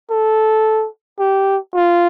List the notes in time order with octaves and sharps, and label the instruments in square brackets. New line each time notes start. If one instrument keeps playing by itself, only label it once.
[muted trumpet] A4
G4
F4